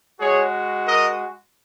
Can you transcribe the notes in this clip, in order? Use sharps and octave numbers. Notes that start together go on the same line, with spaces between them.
G#3 F#4 G#4 C#5
A#4 D#5